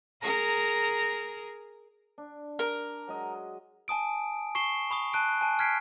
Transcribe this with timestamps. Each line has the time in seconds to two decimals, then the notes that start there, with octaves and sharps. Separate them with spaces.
0.22 G#4 A#4 A#5
2.18 D4
2.59 A#4
3.08 F#3 G#3 D#5
3.88 G#5 A5 D#6 D7
4.55 C#6 C7 E7 G7
4.91 B5 C#6 D#6
5.13 A5 F#6 D7
5.41 G#5 A5
5.59 F6 G#6 B6 C7 D7